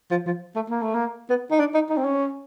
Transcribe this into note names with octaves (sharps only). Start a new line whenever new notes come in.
F3
F3
A3
A#3
A3
A#3
B3
D#4
D4
D#4
D#4
C4
C#4